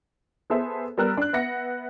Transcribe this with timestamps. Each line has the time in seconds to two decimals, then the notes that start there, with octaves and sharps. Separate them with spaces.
0.50 B3 G#4 A4 C5 E5
0.98 G3 B3 A#4 E6 F#6
1.17 D4 F#6
1.33 B3 E5 F#5 A#6 C#7